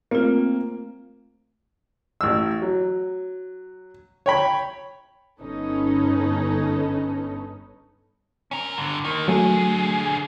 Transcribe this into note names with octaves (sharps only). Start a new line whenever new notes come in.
A3 A#3 C4 F4
A1 E6
F#3
C#5 G5 B5
G1 C#4 D#4 A4 B4
C#4 A#4
G2 D3
D#3 A#3
D3 F#3 A3 G#4